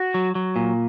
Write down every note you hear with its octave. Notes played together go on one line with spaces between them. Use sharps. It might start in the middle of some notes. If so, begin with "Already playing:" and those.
Already playing: F#4
F#3
F#3
A#2